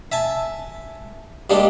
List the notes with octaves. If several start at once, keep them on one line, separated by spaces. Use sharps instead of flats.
E5 G#5 A5
G2 G3 G#3 A#3 D4